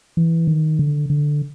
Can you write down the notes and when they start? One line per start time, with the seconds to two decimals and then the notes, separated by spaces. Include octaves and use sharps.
0.17 E3
0.47 D#3
0.79 D3
1.10 D3